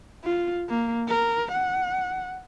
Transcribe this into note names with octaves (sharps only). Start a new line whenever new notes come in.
F4
A#3
A#4
F#5